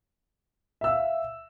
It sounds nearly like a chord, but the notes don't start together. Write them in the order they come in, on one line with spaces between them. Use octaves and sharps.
E5 E6 F5